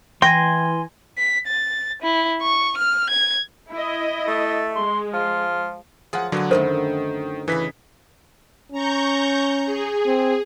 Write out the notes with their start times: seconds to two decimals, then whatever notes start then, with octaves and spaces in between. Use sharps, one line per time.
0.22 E3 G5 G#5 C6 A#6
1.18 B6
1.47 A6
2.03 E4
2.42 C#6
2.77 F6
3.10 G#6
3.71 E4 D#5
4.27 A3 A4
4.76 G#3 C6
5.14 F3 F4
6.13 F3 F#3 F4 G#4 F#5
6.32 D3 F#3 B3 C#5 G#5
6.51 F#2 D3 D#3 A3 A#4 C5
7.48 C#3 E3 D#4 B4 B6
8.72 C#4 A#5 C#6 G6
9.66 G#4
10.06 C4